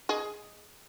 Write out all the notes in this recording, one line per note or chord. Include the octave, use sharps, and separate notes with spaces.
G#4 D#5